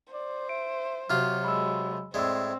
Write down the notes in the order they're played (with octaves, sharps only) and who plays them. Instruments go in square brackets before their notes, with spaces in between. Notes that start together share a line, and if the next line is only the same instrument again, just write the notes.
[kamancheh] C5 [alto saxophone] D5
[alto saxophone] E5 [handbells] D7
[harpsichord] C3 F4 [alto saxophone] F#3 [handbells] F#4 F6
[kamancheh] G#3 [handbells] B5 E6
[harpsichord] A2 G#3 [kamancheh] C4 [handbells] D5 E6